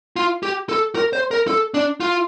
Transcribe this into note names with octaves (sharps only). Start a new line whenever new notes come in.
F4
G4
A4
A#4
C5
A#4
A4
D4
F4